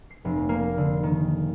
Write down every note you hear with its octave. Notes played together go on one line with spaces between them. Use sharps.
C7
F1
A#3
A#3
D3
D#3